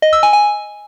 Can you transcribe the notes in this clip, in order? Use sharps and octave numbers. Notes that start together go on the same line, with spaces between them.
D#5
E6
G#5
G#5